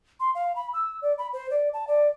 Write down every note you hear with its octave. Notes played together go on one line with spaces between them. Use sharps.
C6
F5
B5
E6
D5
B5
C5
D5
A5
D5